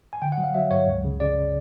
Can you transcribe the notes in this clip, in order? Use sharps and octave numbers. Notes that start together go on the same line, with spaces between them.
G#5
D3 G5
F#5
F#3
F5
F#3 E5
G2 C#5
C#2
C#3
C#3 D5